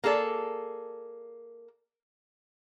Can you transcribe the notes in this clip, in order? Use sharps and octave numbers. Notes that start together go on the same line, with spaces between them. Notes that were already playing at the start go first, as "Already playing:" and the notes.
A#3 G#4 A4 D5